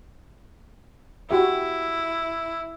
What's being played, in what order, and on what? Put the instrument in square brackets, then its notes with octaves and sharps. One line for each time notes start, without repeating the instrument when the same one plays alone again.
[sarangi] E4 [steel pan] F#4 G4 E5